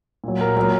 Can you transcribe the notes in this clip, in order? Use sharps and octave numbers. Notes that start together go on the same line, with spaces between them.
A#2 F#3
A#4
A#2 F#3 A#4